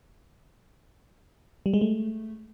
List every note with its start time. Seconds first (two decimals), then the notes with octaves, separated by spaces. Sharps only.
1.66 G3
1.74 G#3
1.81 A3